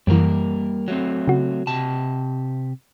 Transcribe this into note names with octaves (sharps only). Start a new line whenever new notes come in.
F#2 E3 G3 A#3 A#4
F#3 A3 C4
C#3 F#4
C3 G4 A5